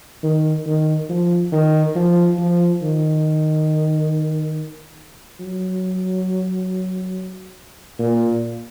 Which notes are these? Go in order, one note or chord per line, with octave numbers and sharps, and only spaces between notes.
D#3
D#3
F3
D#3
F3
F3
D#3
F#3
A#2